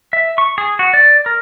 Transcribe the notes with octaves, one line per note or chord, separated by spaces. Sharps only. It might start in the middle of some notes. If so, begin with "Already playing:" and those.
E5
C#6
G#4
F#4
D5
A#4